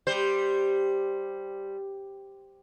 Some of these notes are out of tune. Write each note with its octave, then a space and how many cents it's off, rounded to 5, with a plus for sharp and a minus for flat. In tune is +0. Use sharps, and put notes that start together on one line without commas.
G3 +0 C5 +0